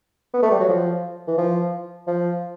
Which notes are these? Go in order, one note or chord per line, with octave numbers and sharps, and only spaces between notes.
B3
A3
G3
F#3
F3
E3
F3
F3